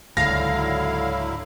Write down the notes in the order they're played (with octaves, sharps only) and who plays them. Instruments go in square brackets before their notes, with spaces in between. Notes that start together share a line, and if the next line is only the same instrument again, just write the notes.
[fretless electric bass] C#2 G#2 [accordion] D3 F#3 E4 [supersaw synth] F5 [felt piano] A#6